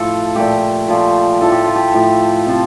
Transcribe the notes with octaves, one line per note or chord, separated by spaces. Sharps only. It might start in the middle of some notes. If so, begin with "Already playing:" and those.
Already playing: A2 F3 A3 A4
A#2 F3 A3 G4
A#2 F3 A3
A2 F3 A3 A4
G4
F4
G4
A2 F3 A3
C3 F3 A3 A4